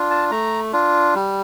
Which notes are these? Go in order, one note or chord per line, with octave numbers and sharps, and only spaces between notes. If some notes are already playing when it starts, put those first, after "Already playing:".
Already playing: D4 F4
A5
A3 A#5
D4 F4
G3